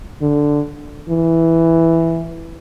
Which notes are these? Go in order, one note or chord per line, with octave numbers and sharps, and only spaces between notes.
D3
E3